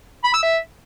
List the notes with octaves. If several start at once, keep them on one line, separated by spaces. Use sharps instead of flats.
B5
E6
E5